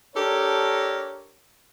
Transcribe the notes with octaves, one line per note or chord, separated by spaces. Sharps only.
D4 G4 A4 A#4 C#5